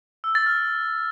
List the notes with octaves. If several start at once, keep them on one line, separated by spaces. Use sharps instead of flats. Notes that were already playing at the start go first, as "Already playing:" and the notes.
E6
A6
F6